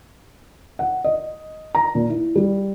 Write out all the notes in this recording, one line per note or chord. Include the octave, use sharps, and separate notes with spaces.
F#5
D#5
A#5
A#2
E4
G3